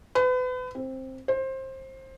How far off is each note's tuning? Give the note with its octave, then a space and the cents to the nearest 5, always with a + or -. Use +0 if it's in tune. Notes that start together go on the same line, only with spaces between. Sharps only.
B4 +35
C4 +10
C5 +20